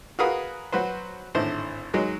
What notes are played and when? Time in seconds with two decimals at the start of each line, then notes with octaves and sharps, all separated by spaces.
0.19 F#4 G#4 A#4 B4 F5 D#6
0.72 F#3 F#4 B4 C5
1.35 G#1 A2 D3 C5
1.93 F#3 G#3 D#4